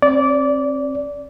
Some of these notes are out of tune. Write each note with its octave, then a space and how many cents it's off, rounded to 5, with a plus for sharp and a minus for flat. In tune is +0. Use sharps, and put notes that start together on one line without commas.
C4 +30 D5 -20